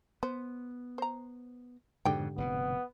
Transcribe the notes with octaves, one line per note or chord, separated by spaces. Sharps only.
B3 C5
C5 A#5
F2 G#2 B2 D3 G4 G5
F1 B2 B3